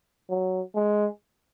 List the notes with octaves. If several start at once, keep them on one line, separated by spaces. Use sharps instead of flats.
F#3
G#3